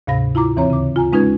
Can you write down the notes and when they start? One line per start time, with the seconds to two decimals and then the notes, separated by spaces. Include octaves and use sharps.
0.07 D2 G#2 C3 F5 B5 A#6
0.35 E4 F4 A#5 D6
0.56 D#2 E3 C4 C#5 A#5
0.70 C#3 D6
0.96 F4 G#5 A#5
1.13 G#3 C#4 D#4 F4 B4 G#6